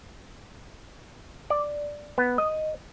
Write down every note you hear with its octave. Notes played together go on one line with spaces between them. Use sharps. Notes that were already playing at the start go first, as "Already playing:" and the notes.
D5
B3
D#5